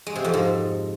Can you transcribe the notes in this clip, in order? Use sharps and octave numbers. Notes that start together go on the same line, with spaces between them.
G#3
C3
F2
G#2